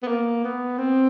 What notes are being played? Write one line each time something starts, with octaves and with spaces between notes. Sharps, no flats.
B3
A#3
B3
C4